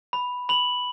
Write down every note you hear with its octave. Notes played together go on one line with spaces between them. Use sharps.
B5
B5 F#7